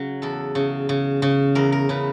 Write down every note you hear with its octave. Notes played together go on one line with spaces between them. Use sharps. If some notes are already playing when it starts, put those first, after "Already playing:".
Already playing: C#3 F#3
E2 A4
C#3
C#3
C#3
E2 A#4
A#4
C#3 B4